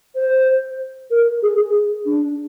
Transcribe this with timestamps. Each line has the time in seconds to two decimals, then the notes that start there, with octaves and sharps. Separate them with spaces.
0.16 C5
1.11 A#4
1.42 G#4
1.58 G#4
2.05 D4